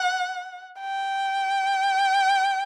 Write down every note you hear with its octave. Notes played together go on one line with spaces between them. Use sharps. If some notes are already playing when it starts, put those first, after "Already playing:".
Already playing: F#5
G5